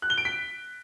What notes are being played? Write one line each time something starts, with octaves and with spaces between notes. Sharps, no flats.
F#6
G7
D7
B6